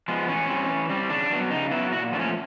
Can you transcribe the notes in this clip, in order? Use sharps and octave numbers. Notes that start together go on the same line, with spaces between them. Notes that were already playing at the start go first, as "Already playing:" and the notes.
F3 G#3 B3
E3 C#4
G3 C4
E3
G3 C4
C#3 D4
F#3 B3
C#3 D#4
F#3 B3 E4
A#2 F#4
F3 A3 D4
C#4